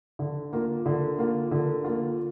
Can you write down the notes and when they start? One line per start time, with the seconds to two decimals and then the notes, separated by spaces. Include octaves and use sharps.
0.19 D3
0.53 A#3 F4
0.86 D3
1.18 A#3 F4
1.51 D3
1.84 A#3 F4